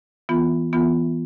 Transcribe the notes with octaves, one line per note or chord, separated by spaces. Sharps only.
E3 B3 F4
E3 B3 F4